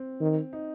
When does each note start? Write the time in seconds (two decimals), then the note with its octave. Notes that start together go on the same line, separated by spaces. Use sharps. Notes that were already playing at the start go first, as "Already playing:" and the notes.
Already playing: C4
0.20 D#3
0.53 D#4